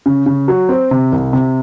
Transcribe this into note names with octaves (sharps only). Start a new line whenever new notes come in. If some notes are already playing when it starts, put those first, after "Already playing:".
C#3
C#3
F#3
C4
C3
C2
C3